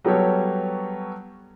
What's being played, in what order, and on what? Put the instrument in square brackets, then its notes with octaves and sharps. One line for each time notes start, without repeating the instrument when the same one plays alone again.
[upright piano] F#3 G3 B3 G4 A4 C#5